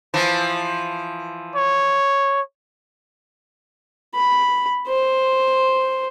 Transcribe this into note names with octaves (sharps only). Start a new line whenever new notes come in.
E3 F3
C#5
B5
C5